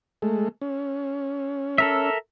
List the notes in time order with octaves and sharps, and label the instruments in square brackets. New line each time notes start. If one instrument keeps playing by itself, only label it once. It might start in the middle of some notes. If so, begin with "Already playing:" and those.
[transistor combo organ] G#3 A3
C#4
[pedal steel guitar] A4 A#4 E5